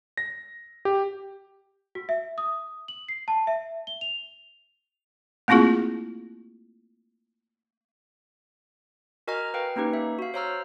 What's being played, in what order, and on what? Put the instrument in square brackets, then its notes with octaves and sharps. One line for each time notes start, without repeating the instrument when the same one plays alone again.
[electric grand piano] A#6
G4
[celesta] F#4
E5
D#6
F#7
C7
A5
E5
G7
F7
[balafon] A3 A#3 C4 E4 F4 G#4
[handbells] F#4 A#4 D#5 G#5 A#5 F6
B4 F5 G5
A#3 C#4 D#4 G4 B4
E5
F#4 F5
C5 C#5 F5 A#5 E6 F6